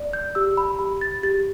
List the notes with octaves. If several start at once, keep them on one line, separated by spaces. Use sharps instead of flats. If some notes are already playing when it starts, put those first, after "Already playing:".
Already playing: D5
G6
G4 E6
B5
G4 B5
A6
G4 A6